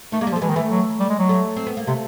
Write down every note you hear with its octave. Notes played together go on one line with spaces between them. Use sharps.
D#3 A3
G#3 A#3
G3
F3
A3
E3 G#3
D#3
E3 A3
F#3
G3
G#3
F#3
A3
C4
B3
A#3
C3 A3